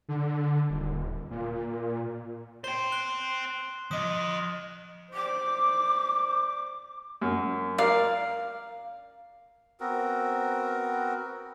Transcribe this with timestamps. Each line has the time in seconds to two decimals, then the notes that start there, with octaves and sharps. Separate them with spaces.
0.09 D3
0.70 D#1
1.31 A#2
2.64 C5 G5 C6 G7
2.92 F#6 G7
3.91 F3 D#5 D6 D#6
5.13 C5 D5 D6
7.21 F#2
7.78 A#4 D5 F5
9.80 B3 C4 F#4 A#4